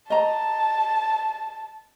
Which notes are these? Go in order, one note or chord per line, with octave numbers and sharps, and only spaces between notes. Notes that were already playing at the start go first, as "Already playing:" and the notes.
D#5 A5 A#5